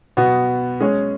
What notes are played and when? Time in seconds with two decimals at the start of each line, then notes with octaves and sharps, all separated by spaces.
0.17 B2 B3 F#4
0.80 G#3 C#4 G#4 C#5